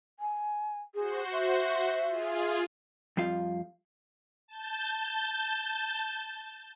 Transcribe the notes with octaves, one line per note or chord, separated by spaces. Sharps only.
G#5
F#4 G#4 C5
E5
F4 G#4
F2 G3 F4 F5
A5 G6